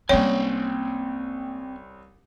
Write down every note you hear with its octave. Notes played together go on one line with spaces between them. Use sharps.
C2 G#3 A#3 C4 C#4 C#5 G5 G#5